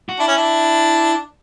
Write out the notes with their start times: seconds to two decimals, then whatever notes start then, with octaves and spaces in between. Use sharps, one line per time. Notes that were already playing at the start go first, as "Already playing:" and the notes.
0.09 F#4
0.19 D4 E4
0.28 C#4
0.37 D4